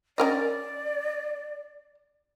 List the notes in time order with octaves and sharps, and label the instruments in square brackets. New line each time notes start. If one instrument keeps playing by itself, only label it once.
[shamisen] C#4 A#4 D#5 [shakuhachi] D5